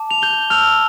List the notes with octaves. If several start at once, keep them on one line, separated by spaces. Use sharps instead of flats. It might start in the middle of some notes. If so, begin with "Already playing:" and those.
Already playing: A5 D6
F7
G6 G7
A5 E6 F6 G6 F7